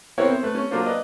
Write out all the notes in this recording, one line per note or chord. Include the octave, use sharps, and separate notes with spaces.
B3 C4 E4 A#4 C#5
C5
A3 B4
C#4
F#3 A#3 D4 F4 C5
B4 D5 D#5